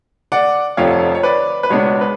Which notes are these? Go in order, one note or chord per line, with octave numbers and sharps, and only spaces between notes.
D5 F#5
F1 F2 D3 F3 C#5 F5
C#5
B4 D5
B4
C#2 B2 G#3 B3 D4 C#5
B4